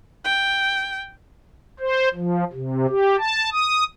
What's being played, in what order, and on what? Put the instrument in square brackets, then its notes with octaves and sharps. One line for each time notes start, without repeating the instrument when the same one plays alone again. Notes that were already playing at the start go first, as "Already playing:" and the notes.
[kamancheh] G5
[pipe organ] C5
F3
C3
G4
A5
D#6